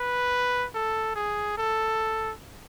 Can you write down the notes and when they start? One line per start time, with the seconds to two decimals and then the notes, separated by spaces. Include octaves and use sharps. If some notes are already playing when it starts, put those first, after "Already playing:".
Already playing: B4
0.74 A4
1.16 G#4
1.58 A4